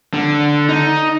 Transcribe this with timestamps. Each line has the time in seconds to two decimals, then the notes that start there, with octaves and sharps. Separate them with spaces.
0.14 D3
0.69 D#4